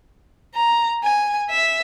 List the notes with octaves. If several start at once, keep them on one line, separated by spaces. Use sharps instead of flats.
A#5
G#5
E5